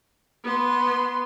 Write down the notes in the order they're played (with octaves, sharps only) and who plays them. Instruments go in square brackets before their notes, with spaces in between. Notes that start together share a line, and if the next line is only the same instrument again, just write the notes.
[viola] B3 C6